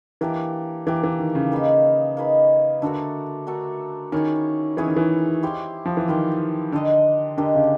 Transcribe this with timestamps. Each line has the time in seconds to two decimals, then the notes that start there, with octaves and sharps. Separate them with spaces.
0.21 E3 A#3 D4 G4 A#4
0.87 E3 A#3 D4 G4 A#4
1.03 E3
1.19 D#3
1.35 C#3
1.52 A#3 D#4 G#4 B4
2.17 A#3 D#4 G#4 B4
2.82 D3 A3 D4 F#4 A#4
3.47 A3 D4 F#4 A#4
4.12 D#3 C#4 E4 G#4 C#5
4.77 E3 C#4 E4 G#4 C#5
4.88 D#3
4.96 E3
5.43 E4 G4 C5 F5
5.85 F3
5.97 E3
6.08 D#3 E4 G4 C5 F5
6.72 D3 D4 G4 A#4 D#5
7.37 D3 D4 G4 A#4 D#5
7.55 C#3